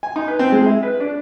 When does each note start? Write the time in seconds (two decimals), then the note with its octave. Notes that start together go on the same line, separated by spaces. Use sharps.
0.03 G#5
0.16 D#4
0.28 B4
0.39 C4
0.52 G#3
0.66 E4
0.83 B4
1.00 D4